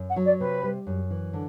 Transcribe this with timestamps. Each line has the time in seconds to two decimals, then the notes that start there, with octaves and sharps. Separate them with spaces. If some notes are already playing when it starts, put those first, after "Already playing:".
Already playing: F#2
0.08 F#5
0.16 F#3
0.25 D5
0.40 C3 B4
0.63 G3
0.87 F#2
1.11 E3
1.33 D3